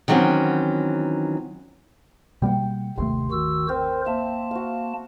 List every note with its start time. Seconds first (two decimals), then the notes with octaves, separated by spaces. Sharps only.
0.08 D#3 E3 F#3 G3 C4 C#4
2.42 B2 G3 A#3 F#5 G5
2.98 G1 D#2 C3 A3 C6
3.32 D#3 F#4 E6
3.69 C4 A#4 C5
4.07 A#3 E5 A5
4.51 F#4 F5